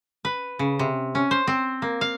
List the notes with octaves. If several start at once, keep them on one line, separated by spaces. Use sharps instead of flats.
B4
C#3
C3
C#4
C5
C4
A#3
F5